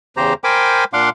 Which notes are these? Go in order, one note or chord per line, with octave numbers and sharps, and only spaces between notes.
E2 C#3 G4 C5 A#5
A#4 C5 G5 G#5 B5 D6
A#2 D4 F5 F#5 C6 D6